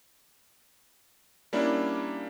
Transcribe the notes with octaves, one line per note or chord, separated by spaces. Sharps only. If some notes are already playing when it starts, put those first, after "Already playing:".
G3 A#3 C#4 D4 E4